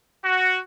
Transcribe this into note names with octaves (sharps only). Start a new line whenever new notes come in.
F#4